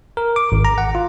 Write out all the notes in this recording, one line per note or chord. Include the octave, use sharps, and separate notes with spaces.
A#4
D6
G#1
A#5
F#5
F4